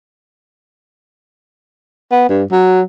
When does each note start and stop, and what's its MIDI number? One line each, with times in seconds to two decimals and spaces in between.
2.12 2.27 59
2.29 2.43 43
2.52 2.81 54